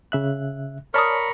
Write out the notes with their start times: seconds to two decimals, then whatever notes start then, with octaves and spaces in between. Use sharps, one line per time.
0.12 C#3 E5 F#6
0.94 A#4 C#5 D5 A5 B5 C#6 D#6 F6